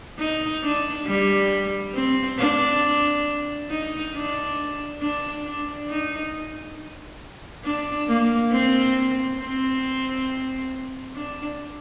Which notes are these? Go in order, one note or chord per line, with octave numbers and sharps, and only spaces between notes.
D#4
D4
G3
C4
D4
D#4
D4
D4
D4
D#4
D4
A#3
C4
C4
D4